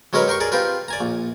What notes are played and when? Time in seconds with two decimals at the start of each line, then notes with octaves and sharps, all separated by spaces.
0.13 F#3 G#3 C#4 A#4 B4 C#5
0.28 G4 A#4 C6 C#6
0.40 G#4 A#4 D5
0.52 C4 F4 G4 A#4 B4
0.88 D5 G#5 A#5
1.01 A#1